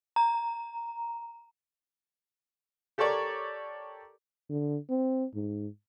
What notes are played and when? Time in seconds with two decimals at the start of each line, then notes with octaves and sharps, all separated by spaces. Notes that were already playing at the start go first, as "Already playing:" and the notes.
0.16 A#5
2.98 G4 A4 A#4 C#5 D5
4.49 D3
4.90 C4
5.35 G#2